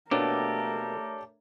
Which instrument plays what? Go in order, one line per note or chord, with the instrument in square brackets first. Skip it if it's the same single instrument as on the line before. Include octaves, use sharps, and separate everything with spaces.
[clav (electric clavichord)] B2 A#3 [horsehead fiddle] A3 A#4 [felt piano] D4 C#5 [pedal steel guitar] G4 A4